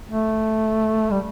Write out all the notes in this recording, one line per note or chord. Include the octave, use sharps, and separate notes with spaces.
A3
G3